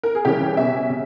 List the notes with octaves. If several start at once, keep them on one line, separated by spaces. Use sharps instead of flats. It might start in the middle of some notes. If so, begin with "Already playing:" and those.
A#4
G#4
C#3 E3 G3 C#4 G4
B2 G3 C#4 E5
C#3